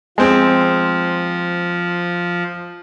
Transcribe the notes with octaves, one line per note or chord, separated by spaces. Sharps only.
F3 G#3 C4